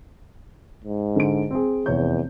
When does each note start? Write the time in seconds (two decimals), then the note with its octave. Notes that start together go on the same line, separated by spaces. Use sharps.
0.84 G#2
1.16 D3 D7
1.51 C4 G#4
1.86 F1 E2 C#5 G6